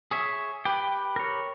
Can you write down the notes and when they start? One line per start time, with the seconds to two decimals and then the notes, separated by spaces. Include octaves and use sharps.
0.11 G#4 C#5 E5
0.65 G4 B4 G5
1.16 A#4 C#5